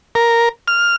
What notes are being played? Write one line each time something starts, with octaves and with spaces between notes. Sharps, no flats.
A#4
F6